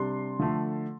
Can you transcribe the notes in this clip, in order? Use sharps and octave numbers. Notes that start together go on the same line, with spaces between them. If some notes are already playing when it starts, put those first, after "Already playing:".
Already playing: C3 G3 D4 C6
D3 F3 A3